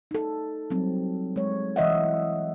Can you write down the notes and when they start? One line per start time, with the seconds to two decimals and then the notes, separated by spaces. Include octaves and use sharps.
0.11 D#4 A4
0.70 F#3 G3 C4
1.36 G#3 C#5
1.76 E3 D#5 E5 F#5